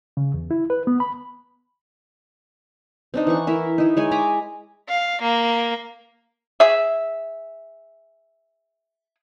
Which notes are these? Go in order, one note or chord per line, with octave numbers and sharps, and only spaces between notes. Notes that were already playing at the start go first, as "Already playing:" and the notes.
C#3
E2
E4
B4
B3
B5
C4 D4 D#4
E3 F#5 C#6
E4 A#4 E5
D#4 E4
G#3 C#5 G#5
G#5 A#5 B5 D6
F5
A#3
G#4 E5